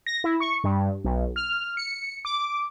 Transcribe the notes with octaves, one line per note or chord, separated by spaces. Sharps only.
A#6
E4
C#6
G2
B1
F6
C#7
D6